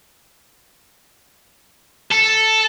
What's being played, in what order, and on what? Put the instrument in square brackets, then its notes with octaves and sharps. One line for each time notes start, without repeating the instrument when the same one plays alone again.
[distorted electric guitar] A4